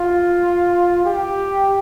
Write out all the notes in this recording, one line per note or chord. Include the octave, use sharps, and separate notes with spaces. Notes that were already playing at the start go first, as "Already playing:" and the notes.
Already playing: F4
G4